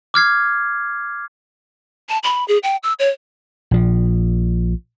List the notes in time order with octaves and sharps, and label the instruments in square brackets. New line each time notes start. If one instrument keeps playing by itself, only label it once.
[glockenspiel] D6 F6 G#6 C7
[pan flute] A5
B5
G#4
G5
E6
C#5
[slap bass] A#1 F3